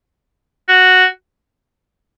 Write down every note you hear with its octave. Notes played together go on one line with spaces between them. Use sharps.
F#4